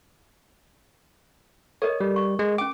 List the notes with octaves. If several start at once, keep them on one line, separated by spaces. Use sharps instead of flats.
A4 A#4 C#5 D#5
G3
C#6
G#3
C#4 G5 D6